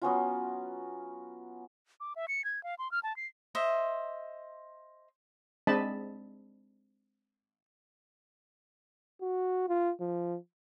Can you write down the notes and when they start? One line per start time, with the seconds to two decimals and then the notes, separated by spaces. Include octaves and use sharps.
0.02 F#3 B3 C#4 F4
2.00 D6
2.16 E5
2.28 C#7
2.45 G#6
2.63 F5
2.79 C6
2.92 F6
3.03 A5
3.17 C7
3.55 C5 D#5 E5
5.67 G#3 C4 D4 D#5 A5 B5
9.22 F#4
9.68 F4
10.00 F3